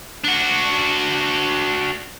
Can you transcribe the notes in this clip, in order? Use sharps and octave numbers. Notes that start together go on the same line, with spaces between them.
D4 F#4